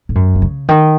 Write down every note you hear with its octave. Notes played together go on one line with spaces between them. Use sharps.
A2
F#2
D#3
C#3
D#3